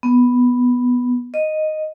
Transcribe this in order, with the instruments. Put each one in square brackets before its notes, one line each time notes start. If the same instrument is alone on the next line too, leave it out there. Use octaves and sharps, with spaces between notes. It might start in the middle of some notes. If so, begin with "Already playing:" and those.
[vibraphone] B3
D#5